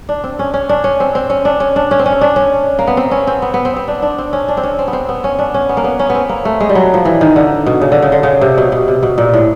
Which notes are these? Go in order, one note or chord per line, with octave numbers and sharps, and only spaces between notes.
D4
C4
C#4
C#4
D4
C#4
C4
C4
C#4
D4
C#4
D4
C#4
C4
C#4
D4
C#4
A#3
B3
C4
C#4
C4
B3
B3
C4
C4
D4
D4
C4
C#4
D4
C4
C#4
C4
B3
C4
B3
C#4
D4
C#4
B3
A#3
B3
C#4
B3
C4
A#3
A3
G#3
G3
F#3
F3
E3
D#3
D3
B2
C#3
D3
C#3
D3
C#3
C3
B2
B2
C3
B2
A#2
A2